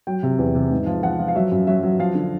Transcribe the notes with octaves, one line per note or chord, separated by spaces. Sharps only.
F#3 G5
C3
E2
C3
G#2
F3
F3 F#5
F3
F5
F#3 E5
F#2
F#3 E5
F#3
F3 F5
D3